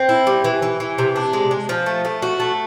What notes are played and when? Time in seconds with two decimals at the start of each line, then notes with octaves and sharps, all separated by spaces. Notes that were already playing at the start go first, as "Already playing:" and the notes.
Already playing: C4
0.09 E4
0.27 G3
0.44 E3
0.62 E3
0.80 E3
0.98 C3
1.16 D4
1.33 G#3
1.51 G#3
1.69 F3
1.86 A3
2.05 A3
2.22 F#4
2.40 A3